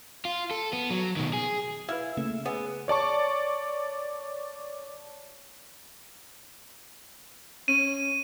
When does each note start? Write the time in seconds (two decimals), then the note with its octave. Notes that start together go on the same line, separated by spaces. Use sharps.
0.25 F4
0.51 A4
0.73 B3
0.90 F#3
1.16 B2 D#3
1.33 G#4
1.89 E4 B4 F5 F6
2.17 C#3 A3 A#3 E5
2.46 B3 G#4 E6
2.88 C#5 D5 A5 C#6
7.68 C#4 D#7